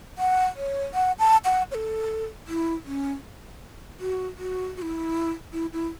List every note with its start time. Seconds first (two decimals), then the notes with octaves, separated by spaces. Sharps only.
0.18 F#5
0.56 C#5
0.94 F#5
1.19 A5
1.45 F#5
1.71 C#5
1.75 A4
2.48 E4
2.86 C#4
4.00 F#4
4.38 F#4
4.77 F#4
4.82 E4
5.53 E4
5.73 E4